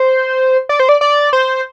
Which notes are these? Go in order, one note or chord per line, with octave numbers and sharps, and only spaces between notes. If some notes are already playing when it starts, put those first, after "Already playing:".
Already playing: C5
D5
C5
D5
D5
C5